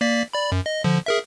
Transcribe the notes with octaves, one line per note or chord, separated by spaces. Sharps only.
A#3 D5 B6
D5 B5
F#2
D#5
D3 F3
G#4 A#4 E5